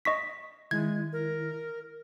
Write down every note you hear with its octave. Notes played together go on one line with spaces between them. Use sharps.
D#5 C#6 B6
D#3 G#3 E4 G#6
A#4